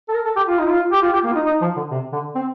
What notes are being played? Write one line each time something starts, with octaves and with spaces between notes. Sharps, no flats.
A4
A#4
A4
G4
F4
D#4
F4
G4
F4
G4
A#3
F4
D#4
D#4
F3
D3
C3
D3
C4